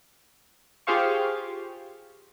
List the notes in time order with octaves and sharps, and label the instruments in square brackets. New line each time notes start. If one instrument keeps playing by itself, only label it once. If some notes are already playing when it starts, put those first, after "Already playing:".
[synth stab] F4 G4 G#4 C5 F5 C#6